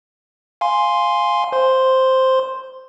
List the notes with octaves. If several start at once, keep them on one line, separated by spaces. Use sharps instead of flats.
F5 G#5 C6
C5 C6